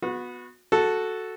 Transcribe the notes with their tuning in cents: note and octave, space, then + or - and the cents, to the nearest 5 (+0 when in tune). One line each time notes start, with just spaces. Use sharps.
B3 +0 F#4 -30
F#4 +0 A4 +0